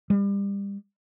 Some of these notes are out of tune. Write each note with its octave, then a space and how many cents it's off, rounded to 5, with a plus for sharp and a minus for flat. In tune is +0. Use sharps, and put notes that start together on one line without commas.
G3 +30